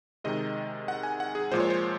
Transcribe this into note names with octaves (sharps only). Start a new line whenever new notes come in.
C3 D#3 G#3 D#5
F#5
G#5
F#5
G#4
A#2 F3 G#3 C5
C#5
C5